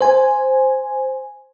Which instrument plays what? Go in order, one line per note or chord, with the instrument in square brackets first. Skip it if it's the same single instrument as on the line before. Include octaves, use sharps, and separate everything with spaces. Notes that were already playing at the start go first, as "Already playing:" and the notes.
[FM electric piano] C5 G#5